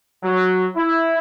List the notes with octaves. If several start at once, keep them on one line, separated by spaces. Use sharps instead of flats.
F#3
E4